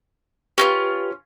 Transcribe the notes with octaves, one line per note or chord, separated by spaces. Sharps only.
C#4 D#4 F4 G4 B4